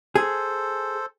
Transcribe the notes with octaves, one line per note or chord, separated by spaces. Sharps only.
G#4 A4 C5